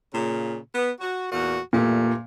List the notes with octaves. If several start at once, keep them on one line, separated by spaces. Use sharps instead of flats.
A#2 C#3
B3
F#4
E2 A#2 F#4
E2 G2 A#2 A3